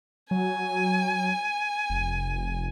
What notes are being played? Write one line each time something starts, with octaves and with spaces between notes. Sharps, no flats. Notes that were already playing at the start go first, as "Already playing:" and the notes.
F#3 G#5
F1